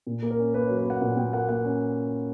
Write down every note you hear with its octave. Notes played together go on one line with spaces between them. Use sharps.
A#2
A#3
A#4
C#4
A#3 B4
F#3 C#5
B4
A#3 F#5
A#2 F#5
A#2 G5
A#3 F#5
A#3 F#5
C#4